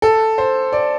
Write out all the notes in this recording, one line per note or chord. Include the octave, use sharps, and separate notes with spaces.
A4
C5
D5